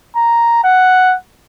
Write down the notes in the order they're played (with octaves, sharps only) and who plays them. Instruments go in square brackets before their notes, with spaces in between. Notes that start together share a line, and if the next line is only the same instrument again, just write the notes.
[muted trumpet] A#5
F#5